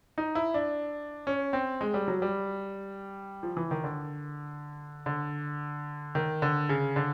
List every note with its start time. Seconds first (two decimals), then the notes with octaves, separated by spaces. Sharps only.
0.18 D#4
0.35 E4
0.54 D4
1.27 C#4
1.53 C4
1.81 G#3
1.94 G3
2.08 F#3
2.22 G3
3.43 F3
3.57 E3
3.71 D#3
3.84 D3
5.06 D3
6.15 D#3
6.42 D3
6.69 C#3
6.96 D3